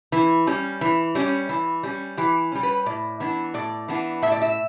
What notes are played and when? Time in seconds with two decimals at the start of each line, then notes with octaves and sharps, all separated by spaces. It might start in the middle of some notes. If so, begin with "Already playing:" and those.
0.12 E3
0.47 G3 C#4
0.81 E3
1.15 G3 C#4
1.49 E3
1.83 G3 C#4
2.17 E3 G4
2.52 G3 C#4
2.63 B4
2.86 A2 D5
3.20 E3 B3 D4
3.54 A2 D5
3.88 E3 B3 D4
4.22 A2 E5
4.32 D5
4.42 E5